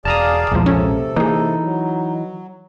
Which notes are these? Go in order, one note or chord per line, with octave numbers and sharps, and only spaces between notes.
E1 G#4 D5 F5 A5 A#5 D#6
B1 E2 A#2 F3 G#3
C3 C#4 A4
E3 A#3 D#4 G#4
F#3